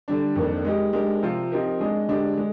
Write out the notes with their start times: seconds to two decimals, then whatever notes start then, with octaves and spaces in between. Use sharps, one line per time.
0.08 D3 G3 D4
0.36 F2 D#3 A#3 D4
0.65 G#3 D#4 G4
0.93 G#3 D4 G4 A#4
1.22 C3 F3 C4 F4
1.52 F3 C4 D#4 G4 A#4
1.81 G#3 D4 G#4 D#5
2.09 D3 G#3 D4 G4
2.37 G#3